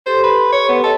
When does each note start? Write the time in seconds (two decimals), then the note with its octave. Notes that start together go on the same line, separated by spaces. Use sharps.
0.06 G4 A4 C5 C6
0.24 B4
0.52 C#5
0.69 B3
0.84 A4 C#5 D#5 A5